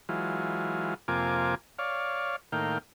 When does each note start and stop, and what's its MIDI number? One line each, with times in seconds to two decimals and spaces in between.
0.09 0.94 52
0.09 0.94 54
0.09 0.94 56
0.09 0.94 65
1.08 1.55 41
1.08 1.55 48
1.08 1.55 58
1.08 1.55 65
1.08 1.55 80
1.08 1.55 86
1.79 2.36 73
1.79 2.36 74
1.79 2.36 77
2.52 2.78 45
2.52 2.78 51
2.52 2.78 58
2.52 2.78 77
2.52 2.78 79